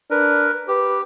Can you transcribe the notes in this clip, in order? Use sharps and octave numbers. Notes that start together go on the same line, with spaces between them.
D4 A#4 B4
G4 B4